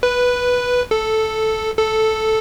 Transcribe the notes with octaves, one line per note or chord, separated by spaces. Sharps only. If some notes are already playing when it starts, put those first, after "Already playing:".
B4
A4
A4